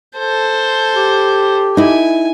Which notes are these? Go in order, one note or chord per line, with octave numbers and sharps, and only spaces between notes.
A4 C5
G4
D#4 E4 G#5